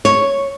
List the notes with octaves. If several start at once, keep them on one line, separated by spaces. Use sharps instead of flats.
C#5